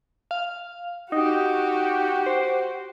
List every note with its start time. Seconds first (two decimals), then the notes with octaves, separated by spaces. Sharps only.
0.31 F5
1.12 D#4 F#4 G4
2.26 C5